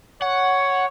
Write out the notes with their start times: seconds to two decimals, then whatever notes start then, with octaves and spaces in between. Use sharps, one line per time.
0.22 C#5 F#5